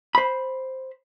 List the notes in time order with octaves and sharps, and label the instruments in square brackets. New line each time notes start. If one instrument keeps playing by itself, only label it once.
[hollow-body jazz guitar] C5 B5